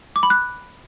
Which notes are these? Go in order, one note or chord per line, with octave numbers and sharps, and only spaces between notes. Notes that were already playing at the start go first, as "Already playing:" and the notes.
D6
B5
F#6